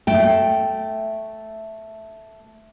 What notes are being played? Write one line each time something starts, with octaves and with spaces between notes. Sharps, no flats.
A3 G5